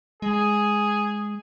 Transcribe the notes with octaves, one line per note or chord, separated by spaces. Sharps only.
G#3 G#4